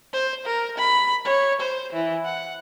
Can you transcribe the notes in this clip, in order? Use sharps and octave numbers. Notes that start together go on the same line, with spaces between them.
C5
A#4
B5
C#5
C5
E3
F#5